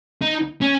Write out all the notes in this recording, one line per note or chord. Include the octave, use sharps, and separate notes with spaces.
D#4
C#4